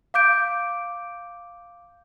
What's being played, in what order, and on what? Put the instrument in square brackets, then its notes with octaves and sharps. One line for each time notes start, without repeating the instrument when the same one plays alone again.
[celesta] F5 D6 G6 D7